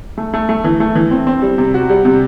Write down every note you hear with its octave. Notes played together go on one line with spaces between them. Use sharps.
A3
A3
A3
E3
A3
E3
C4
C4
G3
C3
F#4
G3
C3